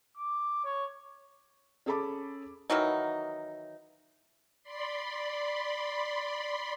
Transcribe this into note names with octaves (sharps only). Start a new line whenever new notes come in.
D6
C#5
C#4 G#4 A4 A5 B5 D6
D#3 E3 F#3 D#4
D5 B5 C6